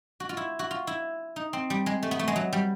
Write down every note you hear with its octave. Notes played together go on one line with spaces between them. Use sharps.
F#4
F4
E4
F#4
F4
E4
D#4
C4
G3
G#3
A3
B3
A3
G#3
F#3
G3